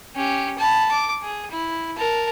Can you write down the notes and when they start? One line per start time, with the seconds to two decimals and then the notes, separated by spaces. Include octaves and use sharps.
0.16 C#4 G4
0.58 A5 B5
0.91 D6
1.23 G#4
1.51 E4
1.97 A#4 A5